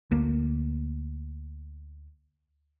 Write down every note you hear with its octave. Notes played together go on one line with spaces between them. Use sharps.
D2 A#3